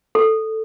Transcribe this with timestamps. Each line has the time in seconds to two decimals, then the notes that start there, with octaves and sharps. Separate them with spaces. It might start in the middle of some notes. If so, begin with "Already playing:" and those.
0.15 A4